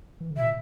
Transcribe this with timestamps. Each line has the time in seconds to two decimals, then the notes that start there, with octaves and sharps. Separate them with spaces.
0.20 E3
0.31 D3
0.36 C3 E5
0.42 A#2